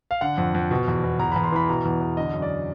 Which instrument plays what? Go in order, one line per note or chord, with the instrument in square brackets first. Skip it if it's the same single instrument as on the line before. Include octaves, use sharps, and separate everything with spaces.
[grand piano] F5
D3 F#5
F2
F2
B2
E2
E2
E2 A#5
E2 B5
C6
E3 B5
B2 A#5
E2
E2
D3 D#5
F#2
D5